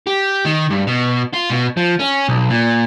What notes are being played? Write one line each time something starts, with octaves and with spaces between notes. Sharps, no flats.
G4
D#3
G2
B2
F4
B2
F3
C#4
B1
A#2